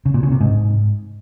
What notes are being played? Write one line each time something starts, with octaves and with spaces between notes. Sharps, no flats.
C#3
A#2
C#3
C3
G#2